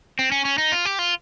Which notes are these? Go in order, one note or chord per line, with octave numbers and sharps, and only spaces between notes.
C4
C#4
C#4
D#4
F4
G4
F4